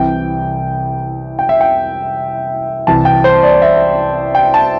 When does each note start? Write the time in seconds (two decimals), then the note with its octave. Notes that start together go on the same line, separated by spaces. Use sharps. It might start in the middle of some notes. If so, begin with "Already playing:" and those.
Already playing: C2 C3 E3 G5
1.39 G5
1.49 E5
1.61 G5
2.87 C2 C3 E3 A5
3.05 G5
3.24 C5
3.43 D5
3.62 E5
4.35 G5
4.54 A5